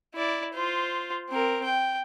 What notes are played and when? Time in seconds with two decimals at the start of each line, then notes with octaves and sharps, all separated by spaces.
0.14 E4 D5
0.54 F4 C5
1.30 C4 A#4
1.64 G5